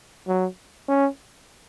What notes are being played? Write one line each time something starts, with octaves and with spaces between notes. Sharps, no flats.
F#3
C#4